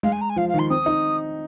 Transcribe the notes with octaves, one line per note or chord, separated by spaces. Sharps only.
G#3 F5
G#5
A#5
G#5
F3 F5
F5
D#3
C6
C4 D#6
D#4